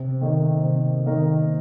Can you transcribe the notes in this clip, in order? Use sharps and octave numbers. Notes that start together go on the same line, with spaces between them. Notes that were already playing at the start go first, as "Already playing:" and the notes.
Already playing: C3
D#3 A#3 D#4 A#4
C3
D#3 A#3 D#4 A#4